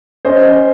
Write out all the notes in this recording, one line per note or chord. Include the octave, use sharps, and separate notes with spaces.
C#4 C5 D#5